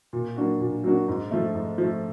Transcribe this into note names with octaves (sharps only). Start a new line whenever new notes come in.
A#2
F#3 A#3 D4 F#4
A#2
F#3 A#3 D4 F#4
G#2
F3 A3
G#2
F3 A3